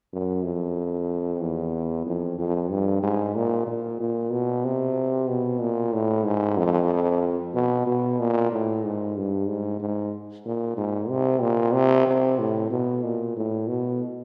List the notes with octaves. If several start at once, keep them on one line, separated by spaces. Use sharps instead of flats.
F#2
F2
E2
F2
F2
G2
G#2
A#2
A#2
A#2
B2
C3
B2
A#2
A2
G#2
F2
B2
B2
A#2
A2
G#2
G2
G#2
G#2
A#2
G#2
C3
A#2
C3
C3
A2
B2
A#2
A2
B2